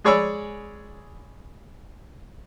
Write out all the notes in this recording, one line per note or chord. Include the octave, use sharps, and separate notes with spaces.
G#3 G#4 C#5 D5 B5 E6